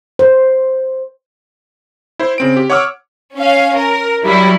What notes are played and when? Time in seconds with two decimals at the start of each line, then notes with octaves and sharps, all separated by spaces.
0.19 C5
2.19 E4 C5
2.38 C#3 C4 D7
2.57 G4
2.70 C#5 F#5 C#6 D6 E6 F6
3.36 C#4 F5
3.75 A#4
4.25 F#3 G3 E4